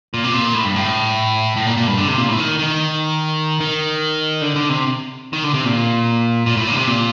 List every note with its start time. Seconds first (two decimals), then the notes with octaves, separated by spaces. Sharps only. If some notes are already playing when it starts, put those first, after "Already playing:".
0.14 A#2
0.24 C3
0.34 A#2
0.54 A2
0.65 G2
0.76 A2
1.57 A2
1.67 A#2
1.77 A#2
1.88 G2
1.97 D3
2.08 C3
2.17 A#2
2.29 A2
2.38 D#3
2.59 D#3
3.61 D#3
4.41 D3
4.56 D3
4.70 C3
5.33 D#3
5.44 D3
5.54 C3
5.65 A#2
6.46 A#2
6.57 A2
6.67 A#2
6.72 D3
6.77 C3
6.87 A#2